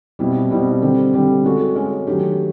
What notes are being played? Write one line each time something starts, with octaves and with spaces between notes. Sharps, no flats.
B2 G3 C4 E4
B2 G3 C4 E4
D3 G3 C4
D3 G3 C4
G#3 C#4 F#4 A4
G#3 C#4 F#4 A4
D#3 F#3 A3 D4 G4